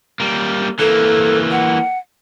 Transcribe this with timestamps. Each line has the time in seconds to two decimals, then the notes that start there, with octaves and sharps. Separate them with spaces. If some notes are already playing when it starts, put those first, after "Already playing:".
0.20 G3 A#3
0.79 E3 A#3 A4
1.51 F#5